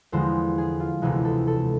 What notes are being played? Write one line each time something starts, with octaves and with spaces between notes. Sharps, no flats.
E2 D3 F3 G#3 C5
G#4
F4
E1 D2 C3 E3 G#3
A4
A4